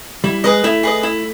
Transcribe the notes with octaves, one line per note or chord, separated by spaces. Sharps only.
G3 E4
G#3 G#4 B4 D#5
A3 E4
G#4 B4 D#5
E4